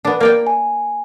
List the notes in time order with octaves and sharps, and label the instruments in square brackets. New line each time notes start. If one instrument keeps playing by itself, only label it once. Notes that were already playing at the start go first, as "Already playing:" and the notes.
[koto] B3 D4
A#3 D5 G5
[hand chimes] G#5